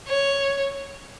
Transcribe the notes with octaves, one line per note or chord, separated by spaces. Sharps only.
C#5